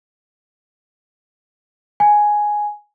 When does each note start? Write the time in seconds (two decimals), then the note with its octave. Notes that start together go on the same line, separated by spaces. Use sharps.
2.00 G#5